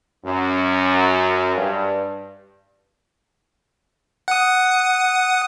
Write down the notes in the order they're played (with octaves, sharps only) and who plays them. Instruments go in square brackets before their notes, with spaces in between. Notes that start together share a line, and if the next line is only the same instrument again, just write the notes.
[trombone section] F#2
G2
[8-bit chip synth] F#5 D#6